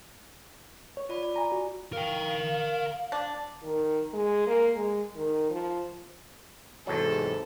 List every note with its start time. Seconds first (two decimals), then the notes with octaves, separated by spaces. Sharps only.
0.97 C#5
1.09 F4 D5 B5
1.23 D5
1.36 G#5 A#5
1.52 F#4
1.93 A#4 F5 G5
3.12 D4
3.63 D#3
4.13 G#3
4.47 A#3
4.76 G#3
5.16 D#3
5.51 F3
6.87 E2 G#2 C3 F#3 A4